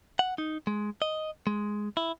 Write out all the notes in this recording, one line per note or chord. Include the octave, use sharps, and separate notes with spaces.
F#5
D#4
G#3
D#5
G#3
E4